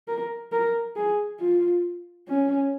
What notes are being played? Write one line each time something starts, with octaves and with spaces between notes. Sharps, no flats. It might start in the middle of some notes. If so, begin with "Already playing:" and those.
A#4
A#4
G#4
F4
C#4